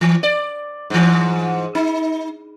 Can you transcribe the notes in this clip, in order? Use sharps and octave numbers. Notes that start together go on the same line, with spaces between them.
E3
D5
G#2 E3
D#4